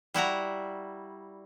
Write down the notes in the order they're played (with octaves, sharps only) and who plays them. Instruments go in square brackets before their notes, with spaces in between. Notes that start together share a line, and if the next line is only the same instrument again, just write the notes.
[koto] G3 E4 F#4 A#5